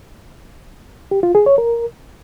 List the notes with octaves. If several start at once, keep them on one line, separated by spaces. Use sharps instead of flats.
G4
F4
G#4
C#5
A#4